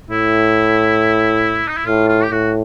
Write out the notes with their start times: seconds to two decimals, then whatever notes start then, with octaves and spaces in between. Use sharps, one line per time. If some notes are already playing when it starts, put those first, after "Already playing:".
0.11 A2 E4
1.68 D#4
1.77 E4
1.86 A2 F4
2.08 F4
2.23 G4
2.31 A2 F#4